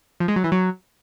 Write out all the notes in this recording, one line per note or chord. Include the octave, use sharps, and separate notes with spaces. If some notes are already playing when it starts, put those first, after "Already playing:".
F3
G#3
F#3
E3
F#3